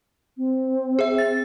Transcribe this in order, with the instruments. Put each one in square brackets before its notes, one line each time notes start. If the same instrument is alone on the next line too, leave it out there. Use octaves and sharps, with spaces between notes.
[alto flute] C4
[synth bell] G#4 E5
A6